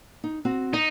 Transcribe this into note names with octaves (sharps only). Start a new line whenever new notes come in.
D#4
C4 F#4
D#4 D#5